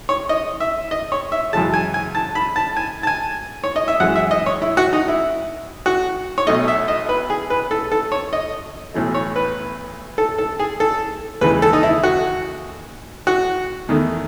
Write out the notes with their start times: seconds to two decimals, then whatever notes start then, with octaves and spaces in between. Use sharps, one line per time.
0.09 C#5
0.29 D#5
0.60 E5
0.91 D#5
1.12 C#5
1.32 E5
1.53 F#2 C#3 E3 G#3 A5
1.74 G#5
1.94 G#5
2.15 A5
2.35 B5
2.56 A5
2.77 G#5
3.03 A5
3.07 G#5
3.64 C#5
3.76 D#5
3.88 E5
4.00 F#2 E3 G#3 F#5
4.16 E5
4.31 D#5
4.46 C#5
4.62 E4
4.77 F#4
4.93 D#4
5.08 E4
5.86 F#4
6.38 C#5
6.47 B1 B2 A3 D#5
6.68 E5
6.88 D#5
7.09 B4
7.30 G#4
7.50 B4
7.71 A4
7.92 A4
8.12 C#5
8.33 D#5
8.94 B1 A2 E3 A3
9.15 C#5
9.36 B4
10.18 A4
10.38 A4
10.59 G#4
10.80 A4
11.41 D#2 C#3 E3 G#3 B4
11.62 A4
11.73 D#4
11.83 E4
12.03 F#4
13.27 F#4
13.89 E2 D#3 A3